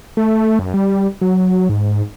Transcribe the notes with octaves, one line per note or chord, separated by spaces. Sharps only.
A3
F#2
G3
F#3
G#2